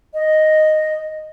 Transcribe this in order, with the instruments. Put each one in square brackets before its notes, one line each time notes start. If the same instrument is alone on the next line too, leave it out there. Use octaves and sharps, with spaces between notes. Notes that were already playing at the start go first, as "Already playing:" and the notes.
[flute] D#5